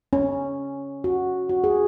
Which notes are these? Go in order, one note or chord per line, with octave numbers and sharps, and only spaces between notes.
C#4
F#4
F#4
G#4